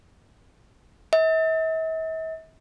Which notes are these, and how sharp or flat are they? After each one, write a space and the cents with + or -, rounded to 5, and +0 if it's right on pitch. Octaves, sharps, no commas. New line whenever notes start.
E5 -45